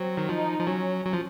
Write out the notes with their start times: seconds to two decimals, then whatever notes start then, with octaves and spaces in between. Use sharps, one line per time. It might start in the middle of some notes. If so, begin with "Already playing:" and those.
Already playing: F#3 C4
0.17 D#3
0.29 F3 D#4
0.59 F3
0.67 F#3 C#4
1.05 F#3
1.13 F3